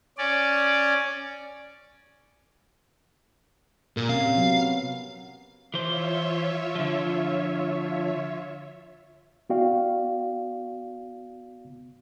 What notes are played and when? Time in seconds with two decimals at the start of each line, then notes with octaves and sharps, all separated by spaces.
0.18 C#4 D5
3.97 A#2 A#4
4.09 C3 C#4 F5
4.36 F#3 B3
5.74 E3 F4 C5 C#5 E5
6.75 D3 F3
9.50 B3 E4 F#4 D5 F5 G5